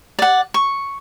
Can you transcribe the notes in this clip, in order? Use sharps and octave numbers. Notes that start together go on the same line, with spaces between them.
D5 F#5
C#6